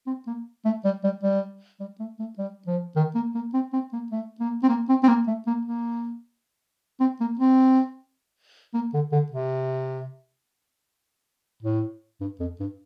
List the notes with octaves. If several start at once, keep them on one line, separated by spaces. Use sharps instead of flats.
C4
A#3
A3
G3
G3
G3
G3
A3
A3
G3
F3
D#3
A#3
A#3
C4
C4
A#3
A3
A#3
C4
A#3
C4
C4
A#3
A3
A#3
A#3
C4
A#3
C4
A#3
D3
D3
C3
A2
G2
F2
G2